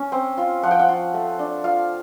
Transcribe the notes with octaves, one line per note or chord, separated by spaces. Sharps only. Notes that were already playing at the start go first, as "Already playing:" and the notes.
Already playing: C#4
C4
F4
F3 F#5
G5
F#5
F4
A3
D4
F4 F5